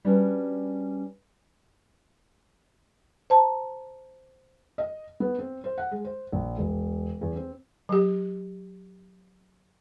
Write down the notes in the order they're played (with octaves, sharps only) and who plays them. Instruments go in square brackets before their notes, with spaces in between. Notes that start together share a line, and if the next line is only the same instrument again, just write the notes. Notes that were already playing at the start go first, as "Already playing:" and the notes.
[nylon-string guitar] G3 C#4 D4 F#4 B4
[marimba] C5 A5 A#5
[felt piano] D#5
B3
C4
C5
F#5
G#3
C5
A#1
E1
E2
C4
[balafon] F#3 G4